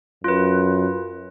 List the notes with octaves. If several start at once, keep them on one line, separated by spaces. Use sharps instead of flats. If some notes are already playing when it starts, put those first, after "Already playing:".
F#2 F4 B4